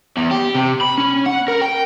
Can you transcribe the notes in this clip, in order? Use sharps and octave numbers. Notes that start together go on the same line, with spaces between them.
E2
G4
C3
B5
C#4
F#5
A#4
G5